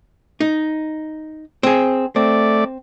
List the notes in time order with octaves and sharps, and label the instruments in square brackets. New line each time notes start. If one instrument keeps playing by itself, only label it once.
[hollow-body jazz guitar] D#4
C4 G#4
[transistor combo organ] A3 D5 [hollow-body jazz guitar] C4